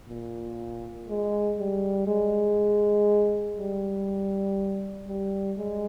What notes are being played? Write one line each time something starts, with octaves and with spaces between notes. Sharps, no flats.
A#2
G#3
G3
G#3
G3
G3
G#3